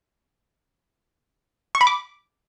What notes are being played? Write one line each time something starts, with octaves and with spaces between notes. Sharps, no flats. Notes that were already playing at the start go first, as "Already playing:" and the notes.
C#6
B5
D6